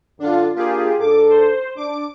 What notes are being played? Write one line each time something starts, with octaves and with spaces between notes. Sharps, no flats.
F#2 D3 D4 F4 A4
A#3 D4 F4 G4 G#4 A#4
G#2 D4 A4 D6
C5
D4 D6 D7